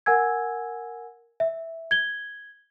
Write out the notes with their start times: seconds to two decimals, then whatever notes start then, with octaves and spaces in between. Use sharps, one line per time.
0.06 A#4 F#5 G#5 E6 G#6
1.40 E5
1.91 G#6 G7